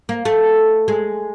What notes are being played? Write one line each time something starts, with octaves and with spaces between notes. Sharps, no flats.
A#3
A3
G#3